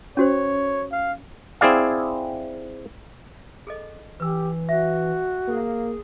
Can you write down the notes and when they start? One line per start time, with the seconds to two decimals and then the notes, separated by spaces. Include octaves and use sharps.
0.17 C#4 F#4 C5 C#5
0.91 F5
1.61 C4 E4 G#4 D5 F5
3.67 G#4 A4 D#5
4.20 E3 G4 B4 E6
4.69 F#4 E5
5.48 A#3 G#4